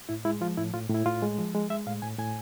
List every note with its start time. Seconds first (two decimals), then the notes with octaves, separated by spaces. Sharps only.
0.09 A2 E4
0.25 G#3 E4
0.41 F3 F4
0.57 A2 E4
0.74 A2 F4
0.89 A2
0.94 E4
1.06 A2 F4
1.22 G#3
1.38 F3
1.55 G#3
1.70 G#3 E5
1.87 A2 F5
2.02 A2 G#5
2.19 A2 G#5